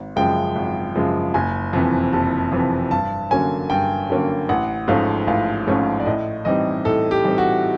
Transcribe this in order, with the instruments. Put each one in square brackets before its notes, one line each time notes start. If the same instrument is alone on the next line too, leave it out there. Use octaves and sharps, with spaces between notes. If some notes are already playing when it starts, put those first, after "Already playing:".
Already playing: [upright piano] G#1
[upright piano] F#2 C#3 F3 G#3 [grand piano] G5
[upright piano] G#1
F#2 C#3 F3 G#3
[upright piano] F#1 [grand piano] G#5
[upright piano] F2 C3 E3
[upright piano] F#1 [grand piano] A5
[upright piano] F2 C3 E3
[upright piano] G2 [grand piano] A5
[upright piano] D3 F#3 A#3 C#4 [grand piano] G#5
[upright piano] G2 [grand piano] G5
[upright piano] D3 F#3 A#3 C#4
[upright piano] A1 [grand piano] F#5
[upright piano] G#2 F3 A3 C#4 [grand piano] F5
[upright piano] A1 [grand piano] F5
[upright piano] G#2 F3 A3 C#4
[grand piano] D5
[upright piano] A2 [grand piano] D#5
[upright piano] E3 G3 C4 D#4 [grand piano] D#5
[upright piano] A2 [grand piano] A4
[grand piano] G4
[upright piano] E3 G3 C4 D#4
[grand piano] F#4